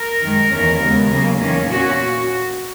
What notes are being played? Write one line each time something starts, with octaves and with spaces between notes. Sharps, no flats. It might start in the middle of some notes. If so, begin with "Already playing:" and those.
Already playing: A#4
F#2 D#3 G#3
E2 D#3 A#3 C#4
D#2 C#3 G#3 B3
C#3 F#3 A#3
E2 D#3 A#3 C#4
A#2 A#3 C#4 F#4